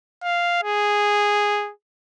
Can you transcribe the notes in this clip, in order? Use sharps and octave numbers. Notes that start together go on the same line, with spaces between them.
F5
G#4